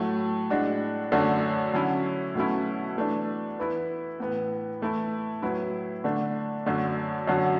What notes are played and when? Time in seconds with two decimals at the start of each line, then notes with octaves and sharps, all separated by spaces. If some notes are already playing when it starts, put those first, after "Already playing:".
Already playing: A2 F#3 A3
0.50 A2 G#3 D4 F#4
1.12 F#2 D3 A3 D4 F#4
1.73 D3 F#3 C#4 E4
2.35 B2 F#3 A3 C#4 E4
2.97 E3 A3 D4
3.58 E3 B3 E4
4.20 A2 E3 B3
4.81 E3 A3 E4
5.42 A2 F#3 B3 E4
6.04 D3 A3 D4
6.66 F#2 D3 A3 D4
7.28 F#2 D3 F#3